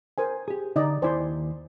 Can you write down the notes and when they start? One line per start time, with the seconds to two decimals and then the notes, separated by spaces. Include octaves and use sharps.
0.18 A#4 C5 G#5
0.48 G4 G#4
0.76 D3 D#4 D5 D#5
1.02 D#2 E4 C5 D5 G#5 C6